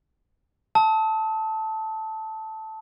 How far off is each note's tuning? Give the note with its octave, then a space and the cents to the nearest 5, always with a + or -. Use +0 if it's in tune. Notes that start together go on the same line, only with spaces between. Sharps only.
A5 +0 D#6 +45